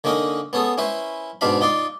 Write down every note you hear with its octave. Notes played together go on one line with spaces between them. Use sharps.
D3 A#3 C#4 D#4 A#4
B3 C#4 G#4 A4
C#4 E4 B4 C5
G#2 B2 C4 D4 F5 B5
D#4 F4 D5 C6